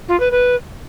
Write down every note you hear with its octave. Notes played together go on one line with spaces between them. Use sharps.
F4
B4
B4